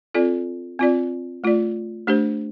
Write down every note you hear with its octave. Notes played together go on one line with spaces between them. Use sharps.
C4 F4 A4 D5
C4 F4 D5
A3 F4 D5
A3 D4 G4 C5